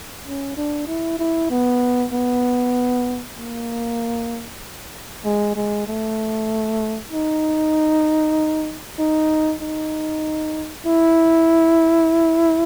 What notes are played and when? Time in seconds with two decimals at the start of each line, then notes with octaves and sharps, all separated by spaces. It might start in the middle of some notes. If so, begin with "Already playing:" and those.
0.25 C#4
0.57 D4
0.87 E4
1.19 E4
1.50 B3
2.12 B3
3.38 A#3
5.24 G#3
5.56 G#3
5.87 A3
7.12 D#4
8.98 D#4
9.61 D#4
10.86 E4